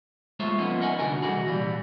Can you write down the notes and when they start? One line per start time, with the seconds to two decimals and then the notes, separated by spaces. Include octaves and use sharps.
0.40 G#3 A3 F4 C5 C#5 E5
0.58 F3 A#3 B3 C#4 D#4
0.81 A#4 D#5 F#5 G#5
0.99 C2 G#2 D3 F#4 A#4 G#5
1.22 C2 A2 E3 F#4 G#4
1.46 A#2 E3 G3